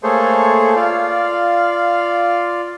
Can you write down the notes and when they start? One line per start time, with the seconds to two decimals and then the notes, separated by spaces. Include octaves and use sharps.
0.03 A3 A#3 G#4 A4 C5 C#5
0.76 F4 D5 F5